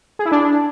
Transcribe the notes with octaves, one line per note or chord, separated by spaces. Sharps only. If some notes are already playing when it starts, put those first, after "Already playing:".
G#4
E4
D4